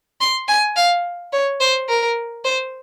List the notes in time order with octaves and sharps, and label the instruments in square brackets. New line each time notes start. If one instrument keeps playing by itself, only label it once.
[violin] C6
G#5
F5
C#5
C5
A#4
C5